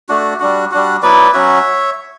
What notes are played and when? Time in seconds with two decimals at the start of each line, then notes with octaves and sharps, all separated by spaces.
0.09 A3 D4 F#4
0.40 G3 D4 F#4
0.71 G3 D4 F#4
1.02 F#3 B3 E4 B4 D5
1.34 F#3 C#4 F#4 C#5 E5